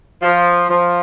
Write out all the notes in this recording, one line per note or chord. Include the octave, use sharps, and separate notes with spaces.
F3
F3